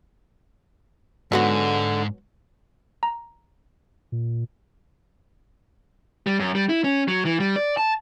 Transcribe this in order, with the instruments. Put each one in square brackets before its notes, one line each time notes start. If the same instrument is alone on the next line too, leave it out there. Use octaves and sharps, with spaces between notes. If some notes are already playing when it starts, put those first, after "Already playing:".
[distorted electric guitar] G#2 [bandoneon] D3 [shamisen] F#3 B3 F#4
[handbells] A#5
[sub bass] A#2
[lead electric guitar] G3
F#2
G3
E4
C#4
F#3
E3
G3
D5
A5